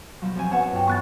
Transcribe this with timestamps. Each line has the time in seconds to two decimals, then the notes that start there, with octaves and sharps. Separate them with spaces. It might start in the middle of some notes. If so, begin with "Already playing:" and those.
0.21 B2 F3 F#3
0.35 F#2 C4 G#5
0.52 B3 B4 C#5 F#5 G#5 A5
0.72 G2 G5
0.88 E3 B3 C#6 F#6 A6